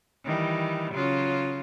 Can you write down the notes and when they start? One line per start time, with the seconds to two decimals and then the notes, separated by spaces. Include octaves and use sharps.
0.24 D#3 E3 G3
0.93 C#3 F#3 F4